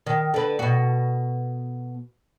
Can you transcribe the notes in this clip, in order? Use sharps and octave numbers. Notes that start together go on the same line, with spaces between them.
D#3
D3 B4
B2 F#4